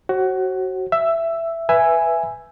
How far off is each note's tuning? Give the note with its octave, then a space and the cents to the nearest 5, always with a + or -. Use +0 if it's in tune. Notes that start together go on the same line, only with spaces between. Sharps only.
F#4 +20 C5 +45
E5 +10 E6 +0
B4 +0 E5 +10 G#5 +0